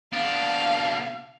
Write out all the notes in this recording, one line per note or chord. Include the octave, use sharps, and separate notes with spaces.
B2 D4 F5